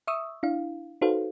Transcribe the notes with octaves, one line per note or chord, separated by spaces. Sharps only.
E5 C#6 D#6 E6
D4 E4 F5
D#4 F#4 A4 B4 C5 F5